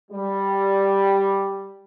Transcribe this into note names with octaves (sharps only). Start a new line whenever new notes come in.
G3